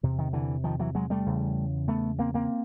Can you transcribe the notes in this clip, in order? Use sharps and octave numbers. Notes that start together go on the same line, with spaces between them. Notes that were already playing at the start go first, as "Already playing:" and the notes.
E2 C3
D#3
D3 E3
D#3 F3
E3 F#3
F#3 G#3
G3 A3
E2 C#3
A3 B3
A#3 C4
A#3 C4